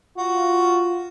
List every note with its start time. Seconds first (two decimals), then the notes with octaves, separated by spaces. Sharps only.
0.18 F4 F#4